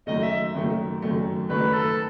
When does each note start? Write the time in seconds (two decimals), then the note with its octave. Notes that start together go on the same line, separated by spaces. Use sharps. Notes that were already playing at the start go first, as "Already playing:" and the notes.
0.07 F#2 D#3 A3 D#5
0.23 E5
0.55 F#2 D#3 A3
1.02 F#2 D#3 A3
1.50 F#2 D#3 A3 B4
1.73 A4